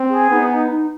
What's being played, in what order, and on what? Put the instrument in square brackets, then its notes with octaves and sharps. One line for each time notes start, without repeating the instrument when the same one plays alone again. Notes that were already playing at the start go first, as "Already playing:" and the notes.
Already playing: [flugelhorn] C4
[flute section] G#4
[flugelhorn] B3 [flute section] D#4
[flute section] D#4
D#4